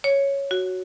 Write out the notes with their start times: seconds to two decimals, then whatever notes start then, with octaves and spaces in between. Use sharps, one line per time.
0.04 C#5
0.51 F#4